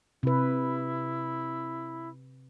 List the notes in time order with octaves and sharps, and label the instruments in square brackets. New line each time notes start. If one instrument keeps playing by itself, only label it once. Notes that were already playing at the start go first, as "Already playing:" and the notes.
[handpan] C3 B4 [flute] E4